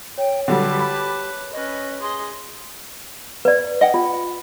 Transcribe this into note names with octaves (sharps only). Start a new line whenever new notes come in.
C#5 G5
D3 F#3 G3 G4 B4 A5
B5
C#4 B4 D#5
G#4 D#5 C6
B4 D5
D#5 F#5 G5
F4